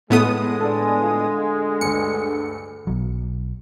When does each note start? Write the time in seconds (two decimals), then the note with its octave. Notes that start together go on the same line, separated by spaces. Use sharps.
0.10 A2 G#3 A3 B3 D#4 D#6
0.61 D3 A4 D5
1.02 F4
1.81 D2 G2 C#7
2.87 B1 F#3